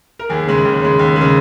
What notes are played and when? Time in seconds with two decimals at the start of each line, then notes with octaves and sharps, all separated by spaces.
0.19 A#4
0.29 D#2 G#4
0.47 C#3 G#3
0.65 D#2
0.81 C#3 G#3
0.99 D#2
1.16 G#3
1.21 C#3